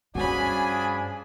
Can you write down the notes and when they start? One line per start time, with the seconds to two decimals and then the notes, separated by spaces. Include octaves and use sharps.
0.15 G2 F3 C#4 D4 F#4 G#4 G#5 B5